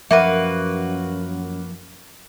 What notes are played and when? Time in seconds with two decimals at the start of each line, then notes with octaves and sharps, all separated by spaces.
0.11 F#2 F3 A#3 F#4 B4 E5